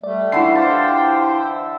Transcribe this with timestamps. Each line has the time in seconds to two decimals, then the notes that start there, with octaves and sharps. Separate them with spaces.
0.04 G3 A3 D5
0.32 D3 E3 E4 C7
0.55 F4 G4 C5 G5 A5
1.44 E5